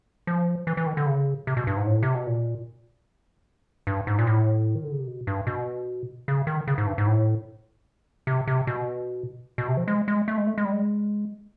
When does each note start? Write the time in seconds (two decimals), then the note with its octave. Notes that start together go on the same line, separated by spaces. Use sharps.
0.27 F3
0.67 E3
0.77 E3
0.86 D#3
0.97 D3
1.06 C#3
1.47 C3
1.57 B2
1.67 G2
1.77 G#2
1.87 A2
2.03 C3
2.15 B2
2.27 A#2
3.87 G2
4.07 G#2
4.19 A#2
4.27 A2
4.75 D#3
4.84 D3
4.92 C#3
5.00 C3
5.07 B2
5.27 G2
5.47 B2
6.28 C#3
6.47 D#3
6.67 C#3
6.78 G#2
6.87 G2
6.98 G#2
7.07 A2
8.27 C3
8.47 C3
8.67 B2
9.58 B2
9.68 C3
9.77 F3
9.88 G#3
10.08 G#3
10.28 A3
10.38 G#3
10.47 A3
10.58 G#3
10.65 G3
10.72 G#3